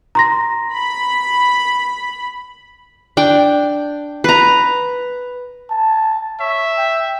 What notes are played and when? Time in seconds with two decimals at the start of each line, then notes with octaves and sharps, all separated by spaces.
0.15 A#5 C6 A#6
0.72 B5
3.17 D4 G5
4.24 B4 A#5
5.71 A5
6.40 C#5 E5
6.77 G5